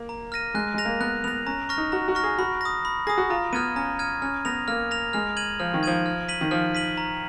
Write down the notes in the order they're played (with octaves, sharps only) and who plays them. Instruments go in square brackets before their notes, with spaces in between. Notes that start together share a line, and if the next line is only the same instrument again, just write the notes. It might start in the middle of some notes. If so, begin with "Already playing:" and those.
Already playing: [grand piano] A#3
[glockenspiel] A#5
F6 A#6 D#7
[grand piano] G#3 [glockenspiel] F#6
[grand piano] G#3 [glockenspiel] A#6 F7
[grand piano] A#3
[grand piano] B3 [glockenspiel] F#6
[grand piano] B3 [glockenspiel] A#6 F7
[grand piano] C#4 [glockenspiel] A#5
[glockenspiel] C#6 F6 A#6
[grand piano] D#4
[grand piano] F#4 [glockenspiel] A#5
[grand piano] F#4
[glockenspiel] C#6 F6 A#6
[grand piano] G#4
[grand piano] F#4 [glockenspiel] B5
[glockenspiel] D#6 A#6
B5
[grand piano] G#4 [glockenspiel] D#6 A#6
[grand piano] F#4
[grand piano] F4 [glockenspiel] A#5
[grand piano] B3 [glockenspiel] F6 G#6 D#7
[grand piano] C#4 [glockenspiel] A#5
[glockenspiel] F6 G#6 D#7
[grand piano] C#4 [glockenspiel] F6
[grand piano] B3 [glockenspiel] A#6 F7
[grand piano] A#3 [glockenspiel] F6
[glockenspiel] A#6 F7
[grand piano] G#3 [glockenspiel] F6
[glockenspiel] G#6 D#7 F#7
[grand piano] F3 [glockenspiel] F6
[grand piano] D#3
[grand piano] F3 [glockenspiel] G#6 D#7 F#7
[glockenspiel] F6
B6 D#7 F#7
[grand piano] D#3
[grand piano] F3 [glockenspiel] F6
[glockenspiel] B6 D#7 F#7
A#5